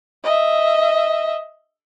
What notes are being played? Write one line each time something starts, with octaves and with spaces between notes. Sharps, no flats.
D#5 E5